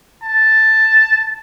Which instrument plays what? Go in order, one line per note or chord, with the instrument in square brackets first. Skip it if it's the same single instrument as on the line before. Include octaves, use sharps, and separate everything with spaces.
[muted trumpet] A5